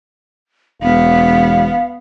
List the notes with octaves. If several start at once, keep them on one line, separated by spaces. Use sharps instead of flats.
E1 B3 F5